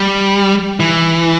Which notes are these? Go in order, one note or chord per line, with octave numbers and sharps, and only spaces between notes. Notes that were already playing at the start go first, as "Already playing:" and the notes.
Already playing: G3
E3